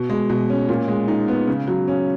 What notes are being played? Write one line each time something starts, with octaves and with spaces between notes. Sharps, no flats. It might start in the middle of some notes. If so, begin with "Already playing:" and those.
Already playing: B2
G#3
B2
C#4
A#2
G#3
D#4
B3
C#3
F#3
C#4